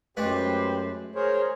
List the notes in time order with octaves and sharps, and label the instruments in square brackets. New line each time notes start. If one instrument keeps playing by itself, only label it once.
[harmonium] F#2 [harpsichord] G#3 A3 D4 [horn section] G4 B4 C5
[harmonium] G#4 C5 C#5 [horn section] A#4